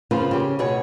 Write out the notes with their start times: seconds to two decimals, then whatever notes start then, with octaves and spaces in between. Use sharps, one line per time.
0.11 C#3 F3 A#3 F4 B4
0.31 C#3 G4
0.59 D2 B2 G#4 B4 C#5